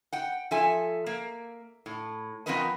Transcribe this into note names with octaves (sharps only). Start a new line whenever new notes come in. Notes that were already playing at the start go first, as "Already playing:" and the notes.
F#5 G5
F3 A4 E5 G#5
A#3
A2
F3 B3 C4 A#4 B4 D#5